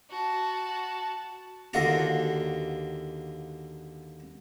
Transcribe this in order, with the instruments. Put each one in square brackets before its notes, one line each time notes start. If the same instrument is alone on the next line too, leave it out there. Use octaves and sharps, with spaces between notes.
[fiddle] F#4 A5
[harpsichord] D#2 D3 F4 F#4 A#5